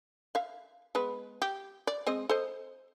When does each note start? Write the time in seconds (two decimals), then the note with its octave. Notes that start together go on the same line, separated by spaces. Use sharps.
0.35 E5 F5
0.95 G#3 B3 B4
1.42 G4
1.87 D5
2.07 G#3 C4 D#5
2.29 A4 C5 D#5